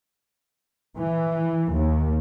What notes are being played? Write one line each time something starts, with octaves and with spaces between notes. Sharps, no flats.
E3
D#2